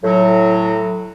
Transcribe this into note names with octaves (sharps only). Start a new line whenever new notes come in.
A2 F#3